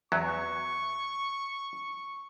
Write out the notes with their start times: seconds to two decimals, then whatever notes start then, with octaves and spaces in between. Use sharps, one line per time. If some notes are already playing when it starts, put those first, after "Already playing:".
0.12 E2 F#3 C#6